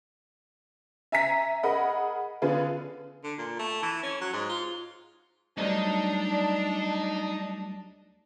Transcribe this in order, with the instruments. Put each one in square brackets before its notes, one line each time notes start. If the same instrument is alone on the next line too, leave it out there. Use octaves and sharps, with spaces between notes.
[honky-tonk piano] E5 G#5 A#5 B6
G#4 A#4 D#5 F#5 B5
D3 B3 C#4 F4 G#4 B4
[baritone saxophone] D3
A#2
A3
E3
C#4
F#3
G#2
F4
[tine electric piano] F#3 G3 A3 [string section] D4 [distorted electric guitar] D#4